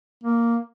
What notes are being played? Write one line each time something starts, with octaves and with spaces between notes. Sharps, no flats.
A#3